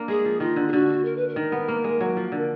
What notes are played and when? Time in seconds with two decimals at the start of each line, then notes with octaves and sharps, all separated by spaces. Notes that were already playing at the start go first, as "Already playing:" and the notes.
Already playing: A#3 D4
0.08 G#3 G#4
0.25 F3
0.40 D#3 F4
0.56 D3
0.68 G#4
0.72 D3 F#4
1.05 A#4
1.17 B4
1.28 A#4
1.36 D#3
1.52 B3
1.68 A#3
1.84 G#3
2.00 F#3
2.17 F3
2.32 D3